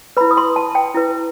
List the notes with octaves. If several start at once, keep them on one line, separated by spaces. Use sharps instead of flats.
E4 B4 B5
D#6
C6
A5
G5
E4 B4